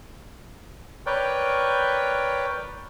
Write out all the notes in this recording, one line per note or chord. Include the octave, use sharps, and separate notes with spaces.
A#4 B4 C#5 D5 G5